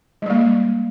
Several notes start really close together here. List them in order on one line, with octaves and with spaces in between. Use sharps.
G#3 G3 A#3